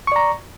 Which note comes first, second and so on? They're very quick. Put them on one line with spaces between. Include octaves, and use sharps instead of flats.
C#6 D5 A#5